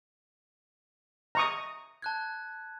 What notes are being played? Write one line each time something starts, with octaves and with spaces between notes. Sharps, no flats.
A#5 C#6 D#6
A5 F#6 G#6